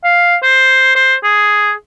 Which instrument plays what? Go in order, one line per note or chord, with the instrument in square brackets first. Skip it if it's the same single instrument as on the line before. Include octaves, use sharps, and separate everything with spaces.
[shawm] F5
C5
C5
G#4